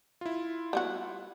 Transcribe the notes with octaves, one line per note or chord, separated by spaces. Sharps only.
E4 F4
G3 B3 F#4